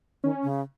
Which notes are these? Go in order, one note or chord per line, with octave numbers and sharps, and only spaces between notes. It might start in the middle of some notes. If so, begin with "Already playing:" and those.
D#3 C#4
C#3